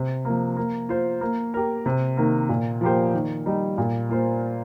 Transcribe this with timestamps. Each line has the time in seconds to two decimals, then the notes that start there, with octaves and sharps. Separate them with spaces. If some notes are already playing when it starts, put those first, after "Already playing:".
Already playing: C3
0.25 F3 A#3
0.57 A#3
0.89 F4 C5
1.21 A#3
1.54 G4 A#4
1.86 C3
2.17 D#3 A#3
2.49 A#2
2.81 F3 A#3 G4 C5
3.14 D#3
3.46 G3 D#4
3.78 A#2
4.09 A#3 F4 C5